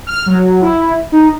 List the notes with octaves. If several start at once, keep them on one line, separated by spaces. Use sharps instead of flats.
F6
F#3
E4
D#4